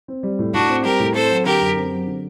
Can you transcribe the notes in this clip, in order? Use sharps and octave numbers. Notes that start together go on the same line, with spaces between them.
C4
G3
A2
A2 D4 F#4
C4
G3 G4 A#4
A2
C4 A4 C5
F#3
D3 G4 A#4
F#2
C4
F#3
D3